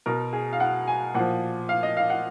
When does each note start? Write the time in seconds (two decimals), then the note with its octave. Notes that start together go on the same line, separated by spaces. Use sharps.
0.06 B2 A#4
0.33 G#4
0.53 F5
0.60 F#5
0.87 G#5
1.14 A#2 F3 F#5
1.69 F5
1.83 D#5
1.97 F5
2.10 F#5